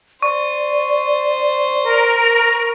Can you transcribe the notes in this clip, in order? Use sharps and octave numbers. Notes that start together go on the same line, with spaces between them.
C5 D5 C#6
A#4